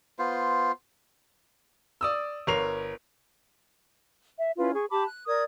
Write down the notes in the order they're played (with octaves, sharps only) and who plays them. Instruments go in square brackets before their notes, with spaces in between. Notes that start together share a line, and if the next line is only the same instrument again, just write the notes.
[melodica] B3 F4 C5
[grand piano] D5 D#6 E6
G1 A#4 C#5 C7 F7
[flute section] E5
C#4 E4 F4 B4
G#4 C#6
G4 A5 B5 D6
F#6
A#4 D5 D#6 G#6